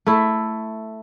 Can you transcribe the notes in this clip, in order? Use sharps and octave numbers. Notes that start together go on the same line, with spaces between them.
A3 E4